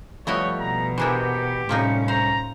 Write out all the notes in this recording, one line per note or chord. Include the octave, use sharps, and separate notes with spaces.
F3 G3 A3 B3 E4 C#5 D#5
B2 A#5
E3 D4 E4 G4 G#4 A#4 C5
C2 A2 F3 A#3 C#4 D#4
C5 A#5